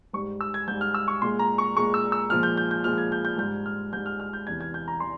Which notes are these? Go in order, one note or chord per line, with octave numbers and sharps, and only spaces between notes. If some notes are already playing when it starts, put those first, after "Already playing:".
G#2 G3 C#6
E6
G#6
G#2 G3 G6
F6
E6
C#6
A#2 G#3 C6
A#5
C#6
A#2 G#3 C#6
E6
E6
A#2 F3 G#3 F6
G6
G6
G6
A#2 F3 G#3 F6
G#6
G6
G6
G#2 G3 G6
F6
G#2 G3 G6
F6
F6
G6
E2 C3 E3 G#6
G#6
G6
A#5
E3 C6